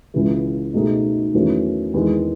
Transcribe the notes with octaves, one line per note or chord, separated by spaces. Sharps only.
C#2 C#3 E3
B2 A3 D#4 G#4
E2 D#3 F#3 A3 C#4
E2 D#3 G#3